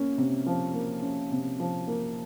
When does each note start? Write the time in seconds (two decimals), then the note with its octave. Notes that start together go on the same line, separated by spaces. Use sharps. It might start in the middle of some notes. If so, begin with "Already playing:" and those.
Already playing: A#3 C#4
0.18 C3
0.46 F3
0.74 A#3
1.02 C#4
1.31 C3
1.60 F3
1.88 A#3